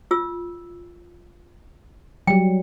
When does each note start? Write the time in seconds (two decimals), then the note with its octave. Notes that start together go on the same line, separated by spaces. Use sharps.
0.11 F4 E6
2.27 F#3 G3 G5